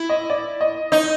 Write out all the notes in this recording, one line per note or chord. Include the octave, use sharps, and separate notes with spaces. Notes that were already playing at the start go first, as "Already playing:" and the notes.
Already playing: E4
D#5
D5
D#5
D#4 D#5